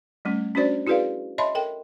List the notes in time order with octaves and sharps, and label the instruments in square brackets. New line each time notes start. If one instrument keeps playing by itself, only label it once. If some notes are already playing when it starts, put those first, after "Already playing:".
[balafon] G3 A3 C#4
C#4 D4 F#4 C5 D5
E4 F#4 G#4 B4 D5 F5
C#5 D#5 E5 A5 B5 C6
A4 A#4 G5